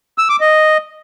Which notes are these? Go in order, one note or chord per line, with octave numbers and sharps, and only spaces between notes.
E6
D6
D#5